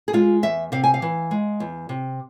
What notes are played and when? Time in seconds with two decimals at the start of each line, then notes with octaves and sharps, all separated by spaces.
0.08 G#4
0.13 G#3 F4
0.43 E2 E5
0.72 C3 F5
0.84 G#5
0.94 F5
1.02 E3
1.31 G#3
1.60 E2
1.89 C3